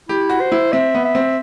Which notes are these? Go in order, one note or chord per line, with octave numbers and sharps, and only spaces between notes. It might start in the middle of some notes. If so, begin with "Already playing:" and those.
E4 G4
F#4
C5
E4
C4 E5
B3
E5
C4